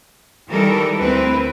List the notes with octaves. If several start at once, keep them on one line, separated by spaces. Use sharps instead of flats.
D#3 E3 G3 G#3 A4 A#4
D2 C4 E4 A#4 B4